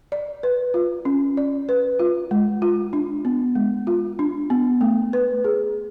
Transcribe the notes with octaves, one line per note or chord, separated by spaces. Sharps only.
D5
B4
F4
C#4
D5
B4
F4
G#3
F4
D4
B3
G#3
F4
D4
B3
A3
B4
G#4